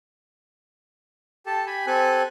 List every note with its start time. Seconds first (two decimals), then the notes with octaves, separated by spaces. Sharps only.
1.46 G4 A4 A5
1.67 G4 G#5 B5
1.87 C4 G4 A4 G#5 F#6